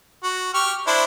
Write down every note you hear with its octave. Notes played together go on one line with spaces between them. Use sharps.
F#4
G4 C#6 F6
D4 E4 C5